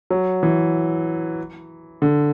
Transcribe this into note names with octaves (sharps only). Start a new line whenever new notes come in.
F#3
E3
D3